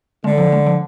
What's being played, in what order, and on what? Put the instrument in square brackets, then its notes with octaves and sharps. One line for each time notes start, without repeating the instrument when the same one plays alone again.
[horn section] D3 [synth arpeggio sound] G#3
[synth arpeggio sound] F3
G#3
F3